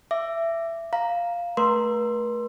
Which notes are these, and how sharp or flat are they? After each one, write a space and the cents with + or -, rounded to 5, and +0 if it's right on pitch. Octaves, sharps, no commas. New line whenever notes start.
E5 +15 D6 +0
F5 +0 A#5 +0
A3 +0 B4 -45 C6 +0